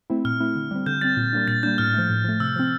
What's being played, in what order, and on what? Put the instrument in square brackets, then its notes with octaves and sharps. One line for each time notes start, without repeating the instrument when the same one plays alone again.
[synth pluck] A3 C4 E4
[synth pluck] A#2 [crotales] F6
[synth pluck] A3 C4 E4
D3
G3 C4
[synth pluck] D3 [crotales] G6
[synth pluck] G3 C4 [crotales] A6
[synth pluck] A#2
G3 A#3 D4
[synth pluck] A#2 [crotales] A6
[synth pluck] G3 A#3 D4 [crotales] G6
[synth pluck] A2 [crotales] F6
[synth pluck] F3 A3
A2
F3 A3
[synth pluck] C3 [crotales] E6
[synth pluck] F3 C4